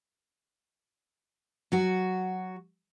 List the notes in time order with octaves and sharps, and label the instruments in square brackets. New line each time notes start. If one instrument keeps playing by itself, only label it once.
[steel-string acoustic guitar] F#3 F#4